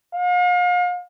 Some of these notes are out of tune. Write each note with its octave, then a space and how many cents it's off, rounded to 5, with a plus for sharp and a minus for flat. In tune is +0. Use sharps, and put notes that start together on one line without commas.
F5 +40